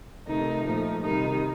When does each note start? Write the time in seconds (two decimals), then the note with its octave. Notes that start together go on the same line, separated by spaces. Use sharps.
0.26 C3 D#3 A3 D#4
0.65 A#2 F3 A3 D#4
1.03 C3 D#3 G3 D#4